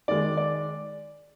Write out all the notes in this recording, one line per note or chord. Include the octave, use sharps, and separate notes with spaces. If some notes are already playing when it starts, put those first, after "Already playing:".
D#3 G#3 D5
D5